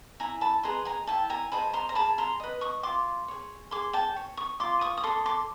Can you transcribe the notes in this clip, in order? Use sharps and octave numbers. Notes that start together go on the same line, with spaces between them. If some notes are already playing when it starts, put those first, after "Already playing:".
E4 G#5 A#5
A5 B5
G#4 B4 D#5 A#5 C6
G#5 A#5
E4 G5 A5
G#5 A#5
G#4 C5 D#5 A5 B5
A#5 C6
A#5
G#4 A5 B5
A#5 C6
B4 D#5
C#6 D#6
F4 C6 D6
G#4 C#5
G#4 C6 D6
G5 A5
C#5
C#6 D#6
F4 C6 D6
C#6 D#6
D#6
A4 C#5 C6 D6
C6 D6